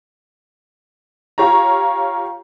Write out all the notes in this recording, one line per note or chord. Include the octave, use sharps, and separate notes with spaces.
F4 G4 C#5 A#5